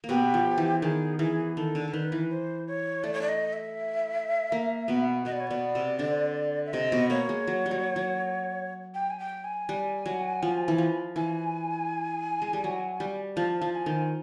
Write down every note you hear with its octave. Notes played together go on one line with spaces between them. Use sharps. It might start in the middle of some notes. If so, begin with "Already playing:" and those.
A#3
B2 B3 G4
F3
E3
D#3 G#4
E3 G#4
D#3 A4
D3
D3
D#3 B4
E3
C5
C#5
A3 D5
C#5
D5
D#5
E5
A#3
B2 B3
B2 B3 D#5
D5
C#5
B2 B3 D5
C3 C4
D3 D4
E5
C3 C4 D#5
B2 B3
A#3 C#5
G#3
F#3
G3
F#3
F#3
G5
G#5
G5
G#5
G3
F#3
F3
E3
F3
E3 G#5
G#3
G3
F#3
G3
F3 A5
F3
G#5
D#3